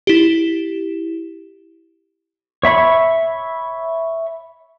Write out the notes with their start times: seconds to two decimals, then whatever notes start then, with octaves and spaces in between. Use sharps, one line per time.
0.07 E4 G4
2.63 C#5 E5 B5 C#6